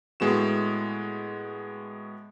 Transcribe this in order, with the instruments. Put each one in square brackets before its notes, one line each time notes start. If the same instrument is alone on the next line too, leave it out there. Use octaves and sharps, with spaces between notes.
[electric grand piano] A2 G#3 B3 F#4 E7